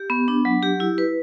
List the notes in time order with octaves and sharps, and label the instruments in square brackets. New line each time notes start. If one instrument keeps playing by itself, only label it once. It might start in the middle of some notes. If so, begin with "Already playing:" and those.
Already playing: [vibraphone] G4
B3
D4
F#3
G4
E4
B4